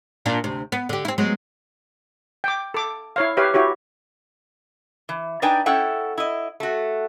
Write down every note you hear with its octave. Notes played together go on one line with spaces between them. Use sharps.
A#2 A#3 D4
D2 C3
B3
D3 G4
C4 E4
F#3 G#3 B3
G5 D6
A4 D6
E4 C#5 F5
G4 B4 C#5 E5 F5
E4 F#4 G4 C#5
E3
D4 D#4 B4 D5 G5 G#5
C#4 E4 A4 F#5 G5
E4 D#5
A3 F#4